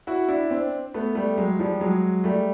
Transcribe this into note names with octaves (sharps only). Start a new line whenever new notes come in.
E4 F#4
D4 E4
C4 D4
A3 B3
G3 A3
F#3 G#3
F3 G3
F#3 G#3
G3 A3